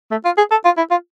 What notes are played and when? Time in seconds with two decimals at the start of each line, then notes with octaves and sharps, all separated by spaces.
0.11 A3
0.25 F4
0.38 G#4
0.51 A4
0.65 F4
0.78 E4
0.91 F4